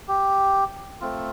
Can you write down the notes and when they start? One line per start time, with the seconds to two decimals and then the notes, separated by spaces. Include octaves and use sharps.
0.08 G4
1.01 A3 C4 F4